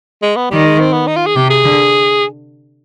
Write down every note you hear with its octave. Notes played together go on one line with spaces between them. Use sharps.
G#3
B3
D#3 G3
G#3
C4
B3
D#4
F4
G#4
C3 G4
G#4
D3